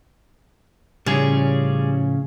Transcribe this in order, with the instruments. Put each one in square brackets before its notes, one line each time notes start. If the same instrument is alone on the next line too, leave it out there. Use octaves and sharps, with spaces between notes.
[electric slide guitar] A2 F3 C#4 [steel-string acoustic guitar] C#3 [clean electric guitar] G3 G#4